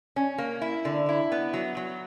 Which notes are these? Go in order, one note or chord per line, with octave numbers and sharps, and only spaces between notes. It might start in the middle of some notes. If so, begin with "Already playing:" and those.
C#4
A#3
E4
D3
E4
B3
F#3
F#3